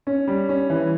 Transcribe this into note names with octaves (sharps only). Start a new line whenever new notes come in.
C#4
G3
C#4
E3